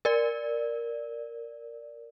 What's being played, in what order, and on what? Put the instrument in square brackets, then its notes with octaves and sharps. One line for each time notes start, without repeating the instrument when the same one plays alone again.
[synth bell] A#4 D5